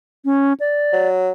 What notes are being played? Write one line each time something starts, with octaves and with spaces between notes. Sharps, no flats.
C#4
D5
F#3